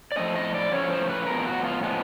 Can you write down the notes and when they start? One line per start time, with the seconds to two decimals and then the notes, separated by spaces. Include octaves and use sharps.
0.12 D5
0.16 A2 F3 A3 C#4 D#5
0.36 D#5
0.54 D5
0.72 A2 F3 A3 C#4 C#5
0.90 C5
1.10 B4
1.27 A2 F3 G#3 B3 A#4
1.45 F#4
1.65 F4
1.83 A2 F3 G#3 B3